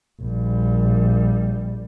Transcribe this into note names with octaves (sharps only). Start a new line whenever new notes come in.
A#1 G3